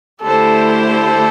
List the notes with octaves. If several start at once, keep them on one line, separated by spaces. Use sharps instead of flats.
D3 A3 E4 G4 A4 C5
A4